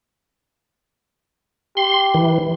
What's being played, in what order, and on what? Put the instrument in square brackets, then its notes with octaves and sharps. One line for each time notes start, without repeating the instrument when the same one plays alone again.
[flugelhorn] G4 [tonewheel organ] C6
[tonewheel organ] E3